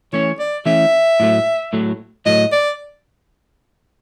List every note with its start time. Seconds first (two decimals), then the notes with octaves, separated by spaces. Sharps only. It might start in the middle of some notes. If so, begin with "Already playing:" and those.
0.13 E3 A3 C#4 C#5
0.39 D5
0.66 E3 A3 C#4 E5
1.20 A2 F#3 A3
1.73 A2 F#3 A3
2.26 A2 F#3 A3 D#5
2.52 D5